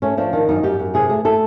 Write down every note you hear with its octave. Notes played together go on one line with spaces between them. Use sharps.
A3 C#4
F3 D4
D#3 D4
F#2 D#4
F#2 G4
F#2
C3 G#4
A3 G#4
A3 A4